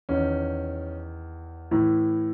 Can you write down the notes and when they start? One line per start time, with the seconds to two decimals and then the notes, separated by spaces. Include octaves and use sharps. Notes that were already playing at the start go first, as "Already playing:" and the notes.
0.09 E2 D#3 C#4
1.71 A2 E3